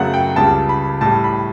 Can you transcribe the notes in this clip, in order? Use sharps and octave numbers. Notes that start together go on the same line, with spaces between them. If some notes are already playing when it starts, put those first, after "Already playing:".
Already playing: F#2 C#3 F#3 A3 F#5
G5
C#2 C#3 G3 A5
B5
A2 G3 A5
B5